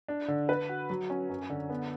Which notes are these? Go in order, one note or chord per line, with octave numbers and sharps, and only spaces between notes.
D4
D3
B4
F#4
F#3
C#4
F#2
D3
B3